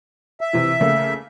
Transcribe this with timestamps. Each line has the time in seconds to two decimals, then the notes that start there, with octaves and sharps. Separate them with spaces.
0.41 E5
0.53 C3 E3
0.80 C#3 A3 A#3